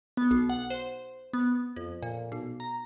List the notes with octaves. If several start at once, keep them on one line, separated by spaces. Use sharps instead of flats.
B3
B1
F#5
C5
B3
F2
A#2
B1
A#5